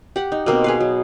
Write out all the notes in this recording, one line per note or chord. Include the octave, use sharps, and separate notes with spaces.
G4 F#5
D#4
B2 A#3 C4
G#4 B4 F5
F#3